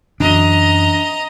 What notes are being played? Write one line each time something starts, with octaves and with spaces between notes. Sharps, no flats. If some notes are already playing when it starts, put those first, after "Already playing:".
F#2 E3 D4 D#5 A#5